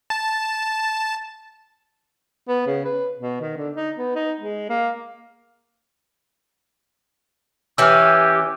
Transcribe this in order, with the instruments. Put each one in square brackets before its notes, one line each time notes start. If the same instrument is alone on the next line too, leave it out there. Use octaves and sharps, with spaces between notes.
[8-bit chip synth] A5
[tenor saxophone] B3
C#3
B4
B2
D#3
D3
D#4
B3
D#4
G#3
A#3
[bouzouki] E3 C#4 [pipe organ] G4 [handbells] E6 F6